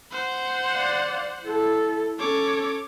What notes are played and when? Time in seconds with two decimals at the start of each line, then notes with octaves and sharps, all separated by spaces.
0.11 C5 F#5
0.73 D5 F5
1.44 E4 A4
2.19 C#4 A4 C#5 D6